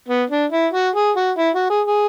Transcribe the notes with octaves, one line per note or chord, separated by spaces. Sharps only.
B3
D4
E4
F#4
G#4
F#4
E4
F#4
G#4
G#4